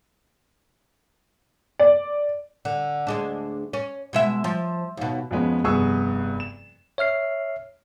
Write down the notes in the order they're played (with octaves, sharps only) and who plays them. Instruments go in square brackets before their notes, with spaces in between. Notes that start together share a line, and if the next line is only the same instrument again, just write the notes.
[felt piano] D5
[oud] D3
D2 G#3 D4
C#4
B2 G#3 E5
F3
D#2 B2
[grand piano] F2 F3 G#3 B3 C#4
F1 G2 B3 G#4 C#6 E6
E7
[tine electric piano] C#5 E5 F6 C7